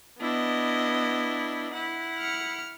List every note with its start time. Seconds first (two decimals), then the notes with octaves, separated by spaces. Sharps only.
0.20 B3 D4 E4 D#5
1.73 E4 F#5
2.19 F6 C#7